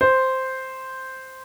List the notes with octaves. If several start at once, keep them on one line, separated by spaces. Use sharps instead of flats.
C5